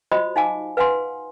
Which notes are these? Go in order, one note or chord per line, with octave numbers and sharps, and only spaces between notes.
F4 F#4 C5 D#5 B5 D#6
D#4 F5 G#5 D6
B4 F5 F#5 G#5 C6